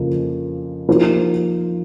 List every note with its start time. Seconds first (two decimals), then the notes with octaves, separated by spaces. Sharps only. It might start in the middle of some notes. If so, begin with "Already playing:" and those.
Already playing: F2 C#3 F3 A#3
0.88 F3 A#3 D#4 G4 C5